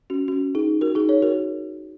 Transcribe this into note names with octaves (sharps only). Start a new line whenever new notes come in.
C#4 F#4
C#4 F#4
D#4 G#4
F#4 A#4
D#4 G#4
G#4 C#5
F#4 A#4